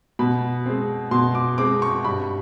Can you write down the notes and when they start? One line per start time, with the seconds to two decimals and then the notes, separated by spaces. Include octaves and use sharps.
0.19 B2 B5
0.66 G#3 C4
1.11 B2 C6
1.35 D6
1.58 G#3 C4 D6
1.82 C#6
2.04 G2 B5